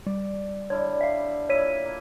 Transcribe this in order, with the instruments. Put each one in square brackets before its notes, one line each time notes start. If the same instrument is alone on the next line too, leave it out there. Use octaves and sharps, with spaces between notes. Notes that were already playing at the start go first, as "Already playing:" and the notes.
[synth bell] G3 [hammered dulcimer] D5
[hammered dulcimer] D3 G3 E4 [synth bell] C#5
[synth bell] E5 F5
[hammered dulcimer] A#2 E4 [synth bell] C#5 B6 D#7
[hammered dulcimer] A#3